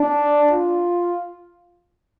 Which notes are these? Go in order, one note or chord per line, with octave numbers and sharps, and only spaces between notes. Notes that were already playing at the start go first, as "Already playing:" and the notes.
Already playing: D4
F4